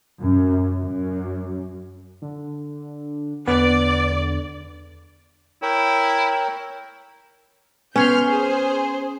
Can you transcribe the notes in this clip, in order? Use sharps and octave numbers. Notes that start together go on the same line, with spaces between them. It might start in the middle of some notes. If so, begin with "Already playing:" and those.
F#2
F#2
D3
E2 D3 B3 D5
E4 A#4 C#5 G5
B3 C#4 C#5 C6 F6 G6
G#4 C5